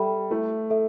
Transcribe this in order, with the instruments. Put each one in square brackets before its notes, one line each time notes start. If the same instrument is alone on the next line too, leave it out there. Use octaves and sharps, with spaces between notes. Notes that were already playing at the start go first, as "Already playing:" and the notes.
Already playing: [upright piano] G3 [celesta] A4 E5 G5 B5
[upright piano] A3 [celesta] E4
[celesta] A4 E5